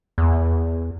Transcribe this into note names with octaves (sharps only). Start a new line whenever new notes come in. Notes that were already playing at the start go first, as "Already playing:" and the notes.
E2